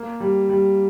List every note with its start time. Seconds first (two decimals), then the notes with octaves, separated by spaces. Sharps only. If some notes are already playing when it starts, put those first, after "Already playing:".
Already playing: A#3
0.20 G3
0.49 G3